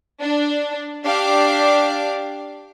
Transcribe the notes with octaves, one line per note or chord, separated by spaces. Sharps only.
D4
D4 G4 F5 D6